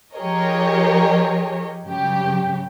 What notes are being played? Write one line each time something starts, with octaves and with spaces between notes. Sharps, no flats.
F3 G4 G#4 A#4 C#5 D#5
G2 C#3 F#3 G4